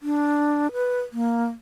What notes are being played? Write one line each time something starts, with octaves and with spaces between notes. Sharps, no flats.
D4
B4
A#3